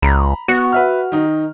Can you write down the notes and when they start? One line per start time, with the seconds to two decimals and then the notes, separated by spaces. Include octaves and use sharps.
0.02 C#2 A#5 B5
0.48 B3 F#4
0.72 B4 E5 F6
1.12 D#3 D#4